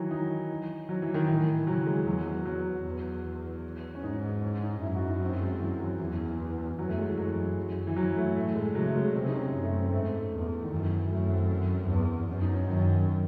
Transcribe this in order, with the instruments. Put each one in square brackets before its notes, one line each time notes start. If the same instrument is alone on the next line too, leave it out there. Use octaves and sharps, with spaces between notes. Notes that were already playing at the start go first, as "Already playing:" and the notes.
Already playing: [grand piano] D#3 E3 F#3
D#4
F#3
E3
D#3
[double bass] A2 [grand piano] E3
[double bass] C#3 [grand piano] F#3
[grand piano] G#3
[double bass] E2 [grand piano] F#3
[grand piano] F#3
F#3
[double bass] E2
[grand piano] C#4
[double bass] G#2 [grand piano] D#4
[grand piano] C#4
C#4
D#4
[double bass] F#2 [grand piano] E4
[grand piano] F#4
D#4
C4
G#3
E3
F#3
[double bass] E2 [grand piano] E3
[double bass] F#2 [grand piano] F#3
[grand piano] A3
G#3
E3
[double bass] F#2 [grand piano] F#3
[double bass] F#2
[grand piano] E3
F#3
A3
[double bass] A2 [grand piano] A3
[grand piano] G#3
[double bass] C#3 [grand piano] F#3
[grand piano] A3
G#3
[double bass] C3 [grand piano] C4
[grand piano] D#4
C#4
[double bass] F#2 [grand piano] D#4
[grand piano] A3
C4
C4
[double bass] G#2 [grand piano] A3
[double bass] E2
[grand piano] D#3
[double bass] F#2 [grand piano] E3
[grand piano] F#3
[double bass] F#2 [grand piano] A3
[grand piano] A3
C4
[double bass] E2
[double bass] F#2 [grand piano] C#4
[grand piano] D#4
C#4
[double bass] F#2 [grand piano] D#3